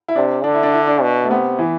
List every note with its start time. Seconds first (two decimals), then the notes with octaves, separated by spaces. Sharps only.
0.08 E4
0.16 C3 D4
0.44 D3 D4
0.54 E4
0.63 D4
0.74 E4
0.87 D4
1.02 B2
1.24 A3
1.31 C3 B3
1.59 E3